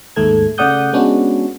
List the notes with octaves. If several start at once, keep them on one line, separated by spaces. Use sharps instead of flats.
D#2 G#2 A3 A4 G#6
C#3 A3 D5 F#5 D#6 G6
G#3 B3 C#4 D4 F#4